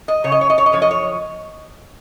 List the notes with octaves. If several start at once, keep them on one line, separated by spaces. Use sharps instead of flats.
D#5
F#2 C#3 C#5
D#5
C#5
D#5
C#5
D#5
F#2 F3 C#5
D#5
C#5